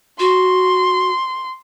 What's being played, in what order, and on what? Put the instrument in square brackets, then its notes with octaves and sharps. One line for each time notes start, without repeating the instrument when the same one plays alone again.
[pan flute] F#4 [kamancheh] C6